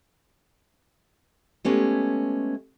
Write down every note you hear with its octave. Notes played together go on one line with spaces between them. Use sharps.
G#3 A3 B3 C#4 G4